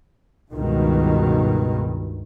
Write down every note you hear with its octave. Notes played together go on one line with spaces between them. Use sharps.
C#2 G2 B2 D#3